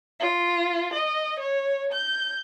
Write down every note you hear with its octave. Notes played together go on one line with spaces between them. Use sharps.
F4
D#5
C#5
G6